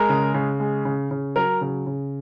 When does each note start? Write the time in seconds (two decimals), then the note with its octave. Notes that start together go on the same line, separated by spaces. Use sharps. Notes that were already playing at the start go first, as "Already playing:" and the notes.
Already playing: G#3 A#4
0.09 C#3
0.34 C#3
0.60 G#3
0.85 C#3
1.11 C#3
1.36 F#3 A#4
1.61 C#3
1.86 C#3